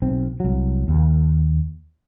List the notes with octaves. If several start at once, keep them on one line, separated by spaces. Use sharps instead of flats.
B1 C4
C2 F#3
D#2